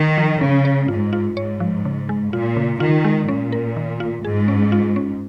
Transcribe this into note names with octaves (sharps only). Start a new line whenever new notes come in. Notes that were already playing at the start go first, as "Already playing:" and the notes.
Already playing: D#3
F3
C#3 C#4
C#5
G#2 F4
F4
G#2 C#5
F3
C#3
G#3
A#2 F4
C#3
D#3 F4
G#3
A#2 C#4
A#4
D#3
F4
G#2 G#4
C#4
F4
C#4